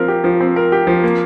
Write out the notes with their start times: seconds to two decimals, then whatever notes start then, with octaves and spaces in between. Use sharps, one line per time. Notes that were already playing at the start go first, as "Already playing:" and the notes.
Already playing: F3 C4 A#4
0.08 G4
0.24 F3
0.40 C4
0.56 A#4
0.72 G4
0.87 F3
1.03 A#3